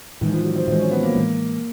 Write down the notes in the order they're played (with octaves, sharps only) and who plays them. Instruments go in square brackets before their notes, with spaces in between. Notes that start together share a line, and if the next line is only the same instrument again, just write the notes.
[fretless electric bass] A2 E3 G#3 [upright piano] D#3
[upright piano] F3
F#3
C4
[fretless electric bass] A2 E3 G#3 [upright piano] C4
[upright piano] C#4
B3
A#3
[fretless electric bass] A2 E3 G#3